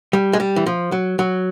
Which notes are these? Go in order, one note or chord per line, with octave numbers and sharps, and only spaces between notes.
G3
G#3
G3
E3
F3
F#3
F#3